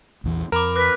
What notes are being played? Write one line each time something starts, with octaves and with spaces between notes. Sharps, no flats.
A#1 E2 E3
F2 A#4 A#5 B5 D6
B4 D6 F#6 A#6